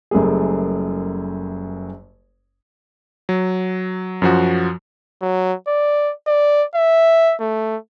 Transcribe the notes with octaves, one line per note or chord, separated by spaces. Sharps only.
F#1 F#2 G3 A3 G#4
F#3
F#2 F3 F#4
F#3
D5
D5
E5
A3